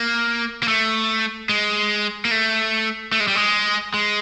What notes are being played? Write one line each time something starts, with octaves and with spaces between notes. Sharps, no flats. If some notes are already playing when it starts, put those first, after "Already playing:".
Already playing: A#3
A#3
A3
G#3
A#3
A3
A3
G#3
G3
G#3
G#3